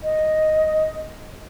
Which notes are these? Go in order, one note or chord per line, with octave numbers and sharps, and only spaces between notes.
D#5